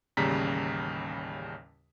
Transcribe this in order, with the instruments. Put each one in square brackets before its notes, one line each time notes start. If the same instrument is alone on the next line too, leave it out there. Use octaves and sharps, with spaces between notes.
[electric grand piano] A1 D#2 C#3 G3 A#5 B6